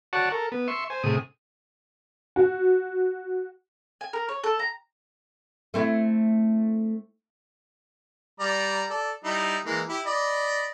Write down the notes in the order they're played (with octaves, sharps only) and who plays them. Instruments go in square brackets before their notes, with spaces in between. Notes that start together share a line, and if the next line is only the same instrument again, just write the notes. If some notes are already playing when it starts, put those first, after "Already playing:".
[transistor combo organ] F#4 C#5 D5 F#5 A5 C#6
A4 A#4
B3
E5 C6 C#6
C5 G#5
A2 C3 G#4 D#6
[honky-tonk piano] F#4
[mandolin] G#5
A#4
C#5
A4
A#5
[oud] A3 C4 E4
[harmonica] G3 D5 A#5
A4 D5
G3 D#4 E4
E3 G#3 A#3
E4 G4
D5 D#5 B5